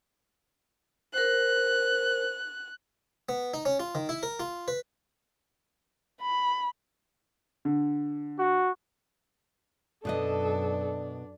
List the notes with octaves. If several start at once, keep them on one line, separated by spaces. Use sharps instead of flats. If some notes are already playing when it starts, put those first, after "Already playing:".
A#4 C5 F#6
B3
D#4
C#4
F4
D#3
E4
A#4
F4
B4
B5
D3
F#4
F#2 B2 D4 A4 B4 D#5